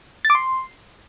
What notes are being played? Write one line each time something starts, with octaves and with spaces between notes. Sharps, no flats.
A6
D6
C6